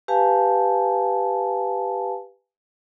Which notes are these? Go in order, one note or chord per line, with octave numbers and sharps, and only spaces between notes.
G4 B4 F5 G#5 A5